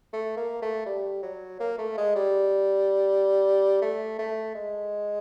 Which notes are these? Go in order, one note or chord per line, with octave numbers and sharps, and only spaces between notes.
A3
A#3
A3
G3
F#3
A#3
A3
G#3
G3
A3
A3
G#3